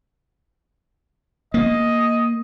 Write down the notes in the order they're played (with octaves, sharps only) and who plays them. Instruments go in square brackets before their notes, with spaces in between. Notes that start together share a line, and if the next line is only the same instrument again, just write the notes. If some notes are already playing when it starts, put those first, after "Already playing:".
[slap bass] A#3 [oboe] D#5